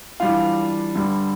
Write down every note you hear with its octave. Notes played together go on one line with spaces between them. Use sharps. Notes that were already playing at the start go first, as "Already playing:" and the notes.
E3 G3 D4 F4 F5
G2 D3 G3